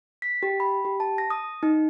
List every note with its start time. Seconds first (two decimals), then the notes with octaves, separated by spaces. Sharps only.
0.22 B6
0.43 G4
0.60 B5
0.85 G4
1.00 A5
1.18 A#6
1.30 D#6
1.63 D#4